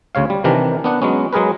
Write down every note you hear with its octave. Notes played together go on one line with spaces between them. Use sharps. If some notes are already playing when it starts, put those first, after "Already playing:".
D2 C#3 C#5 F5
G3
C3 D#3 E3 D4 A#4
B3 D4 F#5
F#3 G#3 B3 C#4
F#3 G#3 G#4 A#4 B4